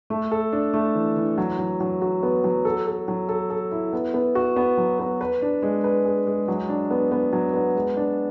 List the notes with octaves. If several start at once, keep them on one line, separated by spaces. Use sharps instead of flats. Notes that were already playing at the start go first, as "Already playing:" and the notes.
A3
A4
D4
A3
E3
E3
F#3
F#3
F#3
F#4
B3
F#3
A4
A4
F#3
A4
A4
E4
B3
B3
F#4
B3
F#3
B3
B4
D4
G#3
B4
G#4
G#3
F#3
D4
B3
B3
F#3
B3
G#3
D4